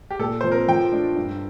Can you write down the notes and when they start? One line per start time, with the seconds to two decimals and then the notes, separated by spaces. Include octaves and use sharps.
0.11 G4
0.19 A#2 A4
0.41 F3 C4 C5
0.52 A#4
0.68 F3 G5
0.92 A3 D4 A4
1.16 G2